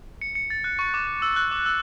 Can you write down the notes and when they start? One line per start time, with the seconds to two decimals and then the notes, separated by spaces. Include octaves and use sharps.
0.21 C#7
0.35 C#7
0.50 A6
0.64 F#6
0.79 C#6
0.94 D6
1.07 D6
1.22 E6
1.36 F#6
1.51 D6
1.66 E6